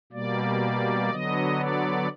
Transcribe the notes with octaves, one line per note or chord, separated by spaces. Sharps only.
B2 G3 A#3 D5
D3 F#3 B3 D#5
D5